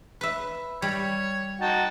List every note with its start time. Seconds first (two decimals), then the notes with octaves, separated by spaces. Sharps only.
0.21 B4 E5
0.82 G3 C#5
1.61 D#4 F#4 G5 A5